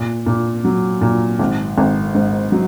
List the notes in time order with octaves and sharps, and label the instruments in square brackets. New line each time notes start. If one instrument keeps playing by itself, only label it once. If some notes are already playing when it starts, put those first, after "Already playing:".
Already playing: [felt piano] A#2
A#2
F#3
A#2
G#1
G#1
G#2
F#3